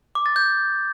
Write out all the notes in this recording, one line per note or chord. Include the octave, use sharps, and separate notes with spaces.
D6
A6
G6